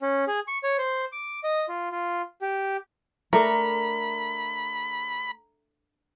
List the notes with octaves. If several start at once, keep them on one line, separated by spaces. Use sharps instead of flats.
C#4
G#4
C#6
C#5
C5
D6
D#5
F4
F4
G4
A3 D4 A#4 A#5 B5